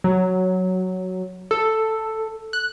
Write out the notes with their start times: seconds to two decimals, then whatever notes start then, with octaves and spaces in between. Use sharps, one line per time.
0.04 F#3
1.51 A4
2.53 F#6